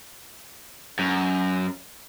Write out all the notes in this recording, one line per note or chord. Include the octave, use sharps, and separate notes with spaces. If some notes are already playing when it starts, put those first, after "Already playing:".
F#2